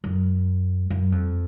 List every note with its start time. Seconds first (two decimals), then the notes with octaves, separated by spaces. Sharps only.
0.04 F#2
0.90 F#2
1.12 F2